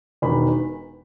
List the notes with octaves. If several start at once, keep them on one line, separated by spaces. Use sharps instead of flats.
E1 E2 D#3 B5